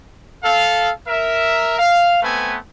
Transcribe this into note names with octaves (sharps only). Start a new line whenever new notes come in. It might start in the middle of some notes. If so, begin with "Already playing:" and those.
A4 F5
A#4 E5
F5
A3 B3 C4 B4 G#5